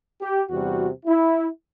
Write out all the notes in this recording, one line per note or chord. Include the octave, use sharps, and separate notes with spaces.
G4
E2 C3 G3 F#4
E4